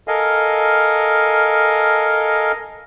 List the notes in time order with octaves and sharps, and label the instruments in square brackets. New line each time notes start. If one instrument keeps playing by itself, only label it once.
[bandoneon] A4 A#4 D#5 F5 G#5